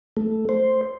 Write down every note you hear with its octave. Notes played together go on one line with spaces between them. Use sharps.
A3
C5